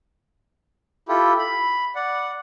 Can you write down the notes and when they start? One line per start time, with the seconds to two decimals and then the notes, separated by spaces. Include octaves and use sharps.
1.08 E4 F4 G4 A4
1.39 B5
1.95 D5 F#5